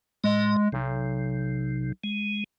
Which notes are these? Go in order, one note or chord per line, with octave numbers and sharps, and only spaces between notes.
A2 G#3 D#5
B1 C3
G#3